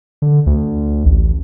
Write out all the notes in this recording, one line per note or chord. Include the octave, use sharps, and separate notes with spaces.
D3
D2
A1